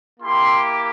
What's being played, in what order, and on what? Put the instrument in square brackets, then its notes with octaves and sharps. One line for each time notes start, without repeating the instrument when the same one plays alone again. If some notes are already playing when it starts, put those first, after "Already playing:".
[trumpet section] A#3 E4 G4 C6